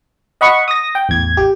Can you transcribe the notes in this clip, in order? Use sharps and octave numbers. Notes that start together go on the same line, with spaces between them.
D#5 F#5 B5 C#6
D#6 A#6
G5
A1 E2 G#6
G4